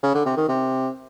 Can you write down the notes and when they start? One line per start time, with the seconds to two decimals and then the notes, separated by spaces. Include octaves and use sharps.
0.03 C#3
0.14 D3
0.26 C3
0.37 D#3
0.48 C3